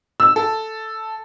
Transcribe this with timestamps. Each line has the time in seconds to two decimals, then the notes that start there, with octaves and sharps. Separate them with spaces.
0.20 E6
0.36 A4